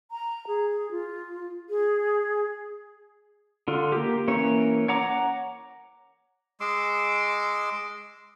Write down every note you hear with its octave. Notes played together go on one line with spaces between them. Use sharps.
A#5
G#4
F4
G#4
D3 F4
A#3 G4
E3 A#3 C#4 C#5
C#5 F#5 A#5 D6
G#3 C6 D6 E6